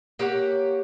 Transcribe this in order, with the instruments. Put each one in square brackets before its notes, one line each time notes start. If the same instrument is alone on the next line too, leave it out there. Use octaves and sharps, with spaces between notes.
[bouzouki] A#3 G4 C#5 F#5